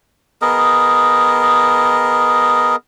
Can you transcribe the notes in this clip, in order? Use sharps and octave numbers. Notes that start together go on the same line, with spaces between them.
B3 G#4 A#4 D#5